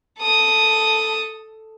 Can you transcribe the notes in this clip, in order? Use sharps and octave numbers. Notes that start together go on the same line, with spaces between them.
A4 D#6